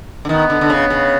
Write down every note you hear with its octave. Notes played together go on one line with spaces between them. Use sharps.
D3
D#3 B3
D3
D3
C#3
C#3